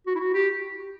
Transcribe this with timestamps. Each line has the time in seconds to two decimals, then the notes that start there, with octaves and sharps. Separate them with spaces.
0.07 F#4
0.15 E4
0.20 F#4
0.34 G4